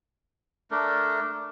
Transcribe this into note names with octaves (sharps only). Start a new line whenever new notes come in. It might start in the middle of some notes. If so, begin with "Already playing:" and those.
A3 D4 A#4